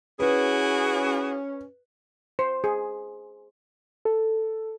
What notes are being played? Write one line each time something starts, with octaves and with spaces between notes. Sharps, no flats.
C#4 E4 F#4 G#4 B4
C5
G#4
A4